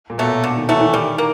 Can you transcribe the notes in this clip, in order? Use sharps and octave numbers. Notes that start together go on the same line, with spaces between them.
A#2
B2 F#3 A3
D3
D#3
E3 F#3 A3
E3
D#3 G3
A#3